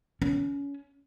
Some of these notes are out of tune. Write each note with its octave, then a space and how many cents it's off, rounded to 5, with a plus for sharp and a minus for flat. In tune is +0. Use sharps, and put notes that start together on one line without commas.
C#4 +25